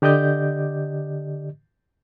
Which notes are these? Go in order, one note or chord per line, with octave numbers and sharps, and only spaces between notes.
D3 G4 D5 D#5 G6